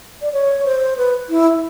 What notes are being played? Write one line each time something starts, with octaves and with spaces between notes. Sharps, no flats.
D5
C#5
C5
B4
E4